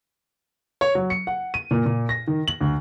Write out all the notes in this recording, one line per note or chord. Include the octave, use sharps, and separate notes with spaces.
C#5
F#3
C#7
F#5
D#7
A#2
A#2
A#6
D#3
F#7
D2